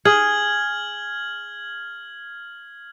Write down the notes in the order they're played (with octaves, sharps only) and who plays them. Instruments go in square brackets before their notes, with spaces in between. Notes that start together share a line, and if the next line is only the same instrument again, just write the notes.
[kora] G#4 [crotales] F6 G#6 F#7